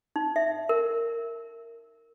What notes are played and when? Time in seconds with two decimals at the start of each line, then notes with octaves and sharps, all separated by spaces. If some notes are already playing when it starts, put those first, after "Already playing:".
0.16 D#4
0.36 E5
0.69 A#4